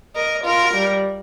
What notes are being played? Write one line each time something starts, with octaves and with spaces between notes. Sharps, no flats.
A#4 D#5
F4 A#4
G3